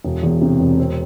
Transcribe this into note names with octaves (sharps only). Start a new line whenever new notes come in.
E1
E2
C3
E1
C4